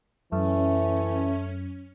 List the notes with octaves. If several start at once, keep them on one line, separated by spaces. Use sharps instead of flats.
F#2 E3 A3 C#4